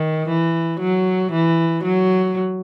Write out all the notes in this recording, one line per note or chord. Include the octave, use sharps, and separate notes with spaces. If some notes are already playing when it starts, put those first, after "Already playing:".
Already playing: D#3
E3
F#3
E3
F#3